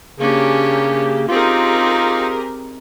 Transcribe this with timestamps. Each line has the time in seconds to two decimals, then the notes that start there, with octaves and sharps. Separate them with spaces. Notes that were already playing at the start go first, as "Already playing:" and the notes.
0.19 C#3 A#3 C#4 D4 G4
1.29 C4 D#4 F4 G4 G#4 A#4